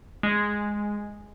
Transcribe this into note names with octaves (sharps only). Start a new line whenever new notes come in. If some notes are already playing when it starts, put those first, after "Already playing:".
G#3